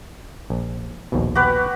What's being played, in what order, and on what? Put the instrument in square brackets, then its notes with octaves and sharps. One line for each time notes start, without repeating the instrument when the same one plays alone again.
[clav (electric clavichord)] A#1
A#1 D#2 B2
[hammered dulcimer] F#4 G4 B4